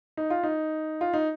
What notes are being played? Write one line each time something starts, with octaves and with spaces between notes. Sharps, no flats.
D#4
F4
D#4
F4
D#4